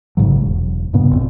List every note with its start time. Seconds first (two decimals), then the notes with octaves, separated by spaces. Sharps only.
0.17 A1 G#2 C#3 F#3
0.42 E1
0.93 G2 A#2 C#3 B3
1.11 G#1 F2